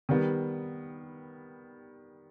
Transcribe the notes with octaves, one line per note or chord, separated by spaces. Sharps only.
D#3 G3 B3